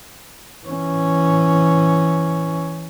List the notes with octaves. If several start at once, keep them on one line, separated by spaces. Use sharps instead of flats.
E3 C#4